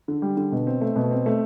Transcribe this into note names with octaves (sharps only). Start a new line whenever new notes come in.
D3
G3
D3
B2
C4
A3
B2
C4
A3